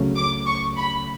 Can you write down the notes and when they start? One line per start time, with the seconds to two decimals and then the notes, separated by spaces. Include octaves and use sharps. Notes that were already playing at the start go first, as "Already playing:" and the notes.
Already playing: C#2 C#3 F#3 A3 C#4
0.16 D6
0.46 C#6
0.77 B5